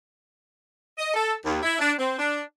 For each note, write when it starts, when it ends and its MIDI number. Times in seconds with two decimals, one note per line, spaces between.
0.97 1.12 75
1.14 1.33 69
1.44 1.58 39
1.63 1.75 64
1.79 1.91 62
1.98 2.17 60
2.17 2.40 62